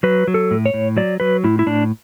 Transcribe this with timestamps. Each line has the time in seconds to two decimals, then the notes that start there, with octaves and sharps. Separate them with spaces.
0.03 F#3 B4
0.28 F#3
0.34 A4
0.51 A2
0.66 C#5
0.74 A2
0.97 F#3 D5
1.20 F#3 B4
1.44 A2 E4
1.59 E4
1.66 A2 D4